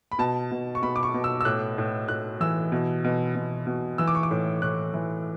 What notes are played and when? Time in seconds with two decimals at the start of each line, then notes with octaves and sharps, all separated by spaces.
0.12 B5
0.19 B2 A5
0.51 B2
0.75 C#6
0.82 B2 B5
0.96 D6
1.03 C#6
1.14 B2
1.24 E6
1.41 E6
1.45 A2 F#6
1.78 A2
2.08 A2 F#6
2.41 E3 E6
2.72 B2
3.04 B2
3.35 B2
3.67 B2
3.98 E3 E6
4.08 D6
4.15 C#6
4.23 D6
4.31 A2
4.62 A2 F#6
4.94 E3